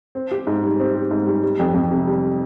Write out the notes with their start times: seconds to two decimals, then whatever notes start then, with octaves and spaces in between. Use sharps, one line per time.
0.15 C4
0.31 G4
0.47 G#2
0.63 G3
0.79 C4
0.95 G4
1.11 G#2
1.27 G3
1.43 G3
1.59 F2
1.74 F2
1.91 C3
2.07 G3